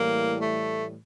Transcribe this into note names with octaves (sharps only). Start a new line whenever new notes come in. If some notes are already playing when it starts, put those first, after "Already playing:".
Already playing: A2 E3 G3 A#3
A3